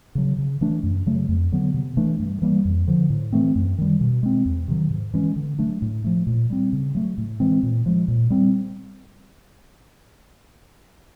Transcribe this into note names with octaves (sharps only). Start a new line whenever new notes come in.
C#3 F#3
C#3
E3 A3 D4
F#2
C#3 F#3 A3
F2
D3 F#3 B3
C3
E3 A3 D4
G2
E3 G3 A#3
F2
D3 F3
A2
E3 A3 C4
F#2
D#3 G3
B2
G#3 C4
E2
C3 D#3 F#3
G#2
E3 G#3 C#4
D3
F#3 A3 D4
A2
F3 A3
A#2
G3 C4
C#3
F#3 A3
A2
E3 G#3 C4
A#2
F3 G#3
A#2
G3 C4